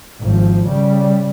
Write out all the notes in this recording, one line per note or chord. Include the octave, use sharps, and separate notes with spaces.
G#1 F3
C#3 G3